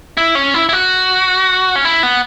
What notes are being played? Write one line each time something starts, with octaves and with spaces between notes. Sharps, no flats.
E4
C#4
E4
E4
F#4
C#4
E4
B3